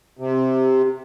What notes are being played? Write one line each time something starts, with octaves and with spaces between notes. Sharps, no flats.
C3